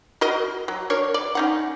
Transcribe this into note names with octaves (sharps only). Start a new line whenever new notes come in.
F#4 A#4 D#5
F#3
D4 A#4 C#5
D5
C#4 D#4 F#5